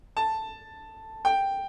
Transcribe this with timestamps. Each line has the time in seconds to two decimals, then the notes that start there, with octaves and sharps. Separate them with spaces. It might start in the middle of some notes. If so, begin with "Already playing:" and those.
0.17 A5
1.25 G5